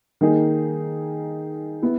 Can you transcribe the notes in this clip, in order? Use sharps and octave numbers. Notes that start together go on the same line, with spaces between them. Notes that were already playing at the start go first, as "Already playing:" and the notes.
D#3 A#3 D#4 G#4
B3 E4